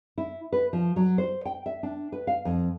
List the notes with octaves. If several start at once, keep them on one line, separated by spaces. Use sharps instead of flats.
E4
B4
F3
F#3
C5
G5
E5
D4
B4
F5
F2